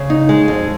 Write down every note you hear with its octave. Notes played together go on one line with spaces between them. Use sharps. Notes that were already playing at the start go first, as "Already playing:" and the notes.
Already playing: C#3 C#5
D#4
G#3
F2